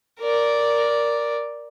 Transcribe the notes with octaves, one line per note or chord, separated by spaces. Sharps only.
A#4 D5